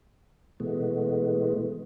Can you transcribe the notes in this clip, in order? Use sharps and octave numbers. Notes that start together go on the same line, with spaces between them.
B2 E3 G#3 A3 B3